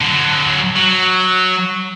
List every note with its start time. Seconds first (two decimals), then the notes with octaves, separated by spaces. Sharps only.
0.01 D3 F#3
0.76 F#3